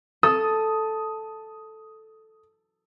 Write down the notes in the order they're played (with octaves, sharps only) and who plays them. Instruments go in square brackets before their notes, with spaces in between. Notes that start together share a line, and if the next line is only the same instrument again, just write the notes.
[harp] A4 [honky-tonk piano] D#6